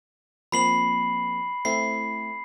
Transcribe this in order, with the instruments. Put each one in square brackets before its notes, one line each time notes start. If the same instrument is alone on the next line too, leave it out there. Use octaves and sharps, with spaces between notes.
[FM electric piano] F3 A#3 C4 [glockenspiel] B5 C7 F#7
[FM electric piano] A3 C4 E4 [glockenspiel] C7